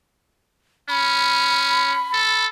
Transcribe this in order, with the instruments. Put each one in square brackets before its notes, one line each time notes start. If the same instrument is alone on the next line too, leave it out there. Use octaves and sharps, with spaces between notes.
[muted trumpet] C#4 [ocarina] B5
[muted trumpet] A4